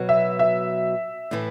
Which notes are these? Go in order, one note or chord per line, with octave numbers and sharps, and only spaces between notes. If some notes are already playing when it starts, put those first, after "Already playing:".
Already playing: B2 F#3 B3
E5
E5
A2 E3 A3